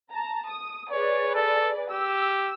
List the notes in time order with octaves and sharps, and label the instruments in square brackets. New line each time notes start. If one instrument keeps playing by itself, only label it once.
[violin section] A5 A#5
D#6
[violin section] G#4 B4 D5 [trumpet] C#5
[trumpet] A4
[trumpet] G4 [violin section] E6